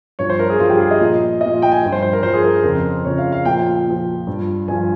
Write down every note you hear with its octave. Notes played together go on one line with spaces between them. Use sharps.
G2 F3 C#5
C5
A#4
G#4
G2 F3 F4
G4
G#4
D#5
A#2 F3
A#2 F3 D#5
G5
G#5
G2 F3
C5
C5
A#4
G2 F3 C5
G#4
A#4
F2 C#3 F3 A#4
F2 C#3 F3 C#5
F5
F5
A#2 F3 G5
A#2 F3
G2 F3
G2 F3 G#5